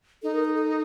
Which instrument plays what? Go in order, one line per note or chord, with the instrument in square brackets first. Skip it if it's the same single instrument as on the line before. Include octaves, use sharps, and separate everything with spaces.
[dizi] D#4 [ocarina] A4
[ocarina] A#4
A4
A4